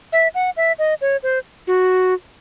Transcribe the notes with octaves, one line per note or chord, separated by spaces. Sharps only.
E5
F#5
E5
D#5
C#5
C5
F#4